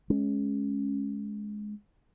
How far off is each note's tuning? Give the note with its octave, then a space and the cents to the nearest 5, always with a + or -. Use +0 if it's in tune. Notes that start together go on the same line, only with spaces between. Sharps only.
G#3 +15 C#4 +0